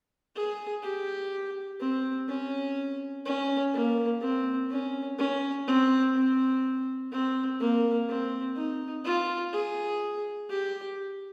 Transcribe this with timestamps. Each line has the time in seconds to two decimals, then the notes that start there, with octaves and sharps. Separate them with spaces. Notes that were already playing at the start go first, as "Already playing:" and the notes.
0.36 G#4
0.83 G4
1.80 C4
2.28 C#4
3.26 C#4
3.73 A#3
4.21 C4
4.70 C#4
5.18 C#4
5.67 C4
6.15 C4
7.12 C4
7.60 A#3
8.09 C4
8.56 D#4
9.05 F4
9.53 G#4
10.49 G4